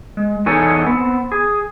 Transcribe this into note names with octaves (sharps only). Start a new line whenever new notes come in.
G#3
E2 B3 D#4 A4 C#5 G#5
B3 C4
G#4